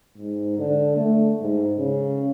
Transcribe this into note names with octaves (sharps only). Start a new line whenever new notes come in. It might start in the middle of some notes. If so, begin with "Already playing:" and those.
G#2
D3
A3
G#2
C#3